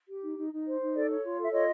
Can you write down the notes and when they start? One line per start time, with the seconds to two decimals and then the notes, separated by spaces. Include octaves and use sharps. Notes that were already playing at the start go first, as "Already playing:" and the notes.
0.08 G4
0.22 D#4
0.37 D#4
0.51 D#4
0.65 C5
0.80 D#4
0.94 A4 D5
1.09 C#5
1.23 F4
1.37 A4
1.43 E5
1.52 F4 C#5 D#5